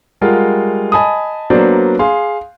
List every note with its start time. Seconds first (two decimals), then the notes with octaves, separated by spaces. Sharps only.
0.21 G3 G#3 F4 A#4 F5 F#5
0.92 D#5 G#5 A5 B5 D#6
1.50 F#3 A#3 B3 D4 C5 D5
1.99 G#4 F5 C6